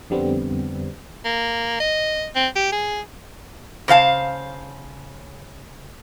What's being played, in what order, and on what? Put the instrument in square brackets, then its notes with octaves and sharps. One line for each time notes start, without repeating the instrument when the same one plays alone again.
[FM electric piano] F2 D3 G3 B3 C4
[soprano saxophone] A#3
D#5
C4
G4
G#4
[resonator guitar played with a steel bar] C#3 C5 F5 A5